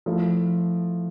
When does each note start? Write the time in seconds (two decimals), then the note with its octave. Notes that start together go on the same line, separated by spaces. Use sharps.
0.06 F3 A3 E4